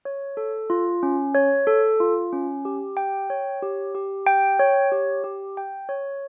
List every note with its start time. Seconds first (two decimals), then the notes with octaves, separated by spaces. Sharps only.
0.05 C#5
0.37 A4
0.70 F4
1.03 C#4
1.35 C#5
1.67 A4
2.00 F4
2.33 C#4
2.65 G4
2.97 G5
3.30 C#5
3.63 G4
3.95 G4
4.27 G5
4.59 C#5
4.92 G4
5.24 G4
5.57 G5
5.89 C#5